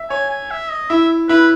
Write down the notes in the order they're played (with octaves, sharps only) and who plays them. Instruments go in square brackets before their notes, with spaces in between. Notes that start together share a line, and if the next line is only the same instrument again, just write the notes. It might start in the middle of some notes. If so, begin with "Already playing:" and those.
Already playing: [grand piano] E5
[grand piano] C#5 [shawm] G#5
[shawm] G#5
E5
D#5
[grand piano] E4 [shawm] E5
[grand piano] E4 [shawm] B4